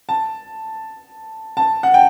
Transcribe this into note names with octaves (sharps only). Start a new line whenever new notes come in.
A5
A5
F#5
G5